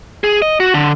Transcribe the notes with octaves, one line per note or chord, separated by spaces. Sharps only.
G#4
D#5
F#4
D3